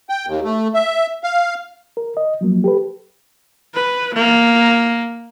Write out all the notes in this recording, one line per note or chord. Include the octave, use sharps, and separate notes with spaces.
G5
D#2
A3
E5
F5
A#4
D#5
F3 F#3 A#3
G4 A4 B4
B4
A#3